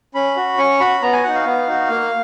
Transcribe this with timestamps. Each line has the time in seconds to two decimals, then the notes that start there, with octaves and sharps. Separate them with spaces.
0.15 C#4 B5
0.36 F#4
0.58 C#4 C#6
0.80 F#4 B5
1.02 B3 A#5
1.13 G#5
1.24 D#4 F#4 F#5
1.35 F5
1.46 B3
1.67 D#4 F#4
1.90 A#3